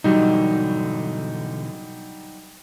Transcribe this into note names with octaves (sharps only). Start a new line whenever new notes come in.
B2 D3 E3 F#3 G3 D#4